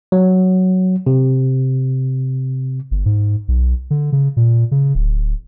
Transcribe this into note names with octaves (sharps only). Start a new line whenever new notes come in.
F#3
C3
G1
G#2
B1
D3
C#3
A#2
C#3
D1